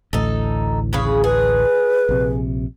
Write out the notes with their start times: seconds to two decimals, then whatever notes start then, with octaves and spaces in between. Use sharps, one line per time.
0.13 A1 D2 A2 D#4 A4
0.93 C#3 G#4 B4
1.24 G#4 B4
2.09 A#1 C3